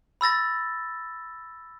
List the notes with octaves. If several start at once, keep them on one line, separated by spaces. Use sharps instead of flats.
B5 E6 A6 A#6